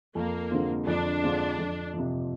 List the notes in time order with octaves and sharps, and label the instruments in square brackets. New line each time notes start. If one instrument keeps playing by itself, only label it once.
[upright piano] F2 [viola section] A#3
[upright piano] D3 G#3 C4 F4
[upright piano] F2 [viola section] D4
[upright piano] D3 G#3 C4 F4
F2
F3
C3